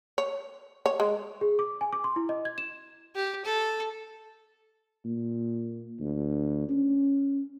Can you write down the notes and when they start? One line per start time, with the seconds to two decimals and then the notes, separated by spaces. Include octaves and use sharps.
0.18 C#5
0.86 C#5
1.00 G#3
1.41 G#4
1.59 D6
1.81 G#5
1.93 D6
2.04 C6
2.16 E4
2.29 D#5
2.45 G#6
2.58 E7
3.15 G4
3.44 A4
5.04 A#2
6.00 D2
6.69 C#4